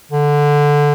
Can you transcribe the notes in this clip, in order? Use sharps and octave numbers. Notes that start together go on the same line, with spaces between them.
D3